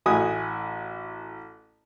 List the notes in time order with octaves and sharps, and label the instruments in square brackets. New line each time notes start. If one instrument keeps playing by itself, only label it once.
[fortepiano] A1 E4 F#4 G#5 D#6